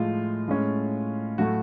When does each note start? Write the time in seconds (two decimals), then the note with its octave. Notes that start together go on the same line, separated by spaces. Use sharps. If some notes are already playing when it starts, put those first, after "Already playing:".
Already playing: A2 F3 G#3 F4
0.48 A2 G#3 C#4
1.38 A2 F#3 A3 F#4